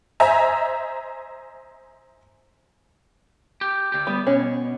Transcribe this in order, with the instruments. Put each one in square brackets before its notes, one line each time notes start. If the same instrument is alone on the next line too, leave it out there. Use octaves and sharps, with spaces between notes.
[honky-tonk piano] C5 D#5 E5 G#5 A#5
[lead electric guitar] G4
D2 G4
[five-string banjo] G3 [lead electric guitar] B3
[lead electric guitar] B2 [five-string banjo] C#4